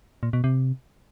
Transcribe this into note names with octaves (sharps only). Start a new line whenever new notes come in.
A#2
B2
C3